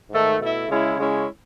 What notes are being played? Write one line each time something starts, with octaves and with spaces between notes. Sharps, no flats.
G#2 D#3 A3
B2 A3 E4
C#3 G#3 C#4 E4
C#3 G#3 C#4 E4